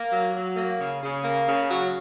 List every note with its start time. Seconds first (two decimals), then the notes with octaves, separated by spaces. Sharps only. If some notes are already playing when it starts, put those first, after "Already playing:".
Already playing: A#3
0.11 F#3
0.34 F#3
0.56 A#3
0.80 C#3
1.02 C#3
1.24 A#3
1.47 C#3
1.69 F#3